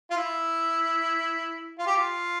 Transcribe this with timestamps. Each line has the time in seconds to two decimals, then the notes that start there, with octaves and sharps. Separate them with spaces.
0.11 F4
0.17 E4
1.78 F4
1.87 G4
1.96 F4